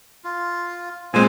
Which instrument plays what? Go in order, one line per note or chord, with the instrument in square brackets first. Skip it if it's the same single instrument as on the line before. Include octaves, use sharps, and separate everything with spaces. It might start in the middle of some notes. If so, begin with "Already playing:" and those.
[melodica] F4
[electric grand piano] A#2 G#3 C4 [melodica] C5 G#5